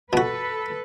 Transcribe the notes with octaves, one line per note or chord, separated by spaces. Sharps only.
B2 F#4 A4 B4